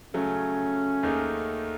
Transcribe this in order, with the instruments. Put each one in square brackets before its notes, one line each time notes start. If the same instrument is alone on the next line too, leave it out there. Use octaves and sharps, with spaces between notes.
[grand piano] C#3 F#3 A3 [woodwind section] C#4
[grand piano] D#2 D#3 A3 D#4 G#4